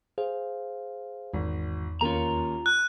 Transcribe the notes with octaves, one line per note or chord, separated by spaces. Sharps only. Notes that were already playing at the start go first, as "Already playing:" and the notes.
G#4 C5 F5
G#1 E2
D#2 A#3 C#4 F4 A#5
F#6